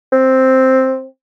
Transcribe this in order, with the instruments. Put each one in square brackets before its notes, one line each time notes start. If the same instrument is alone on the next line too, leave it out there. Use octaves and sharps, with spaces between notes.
[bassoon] C4